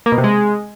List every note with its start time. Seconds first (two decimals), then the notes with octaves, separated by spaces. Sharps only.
0.06 A#3
0.12 B2
0.18 C3
0.24 G#3